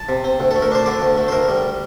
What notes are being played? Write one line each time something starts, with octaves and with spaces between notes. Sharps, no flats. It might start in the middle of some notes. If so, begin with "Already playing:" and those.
Already playing: A5
C3
C4
D2
A3 A4
A#4
D4 C5
D3 D5
D2
A3
C5
D2 A#4
G3